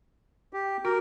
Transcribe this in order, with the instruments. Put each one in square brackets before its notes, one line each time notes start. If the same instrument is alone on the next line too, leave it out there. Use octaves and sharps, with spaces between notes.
[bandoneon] G4
[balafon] F#4 [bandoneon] A#4